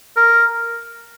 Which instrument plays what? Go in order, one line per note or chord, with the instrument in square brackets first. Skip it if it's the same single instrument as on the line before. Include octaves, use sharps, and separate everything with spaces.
[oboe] A#4